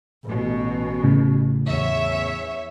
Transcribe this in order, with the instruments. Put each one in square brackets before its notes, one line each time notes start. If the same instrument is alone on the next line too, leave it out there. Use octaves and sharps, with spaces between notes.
[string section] A1 B2
[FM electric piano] A2 C#3
[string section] E2 C#5 E5